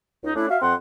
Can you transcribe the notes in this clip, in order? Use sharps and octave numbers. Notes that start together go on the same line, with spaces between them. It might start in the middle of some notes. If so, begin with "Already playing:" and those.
C#2 D#4
A3 C#4 D4 E4
F#4 E5 F5
F2 C4 F#5 C6